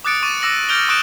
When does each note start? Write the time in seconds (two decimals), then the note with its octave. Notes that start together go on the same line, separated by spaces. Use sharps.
0.05 D6 D#6 F#6 A6 C#7 D7
0.23 C#6 D6 A6 D#7
0.42 D6 E6 A#6 F#7
0.69 F6 G6 A6 D7 F7 G7
0.89 C#6 D#6 E6 F#6 D7 E7